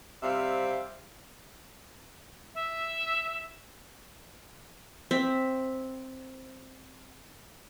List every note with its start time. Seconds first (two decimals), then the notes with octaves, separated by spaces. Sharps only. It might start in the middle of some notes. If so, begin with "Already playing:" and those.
0.23 C3 G3 C4 E5 F5
2.55 E5
5.11 C4 E5